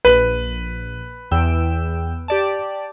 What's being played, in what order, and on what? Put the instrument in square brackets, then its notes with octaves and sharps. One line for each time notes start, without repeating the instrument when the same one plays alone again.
[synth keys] A#1 [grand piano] B4
[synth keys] E2 G5 E6
G4 D5 A5